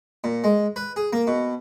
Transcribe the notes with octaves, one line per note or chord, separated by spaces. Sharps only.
A#2
G#3
B4
G#4
A#3
B2